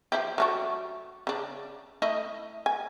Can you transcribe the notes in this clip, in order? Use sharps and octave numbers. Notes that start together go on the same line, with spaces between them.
F3 E4 G4
F#3 A3 D4
C#3 D4
A3 E4 D#5
G#5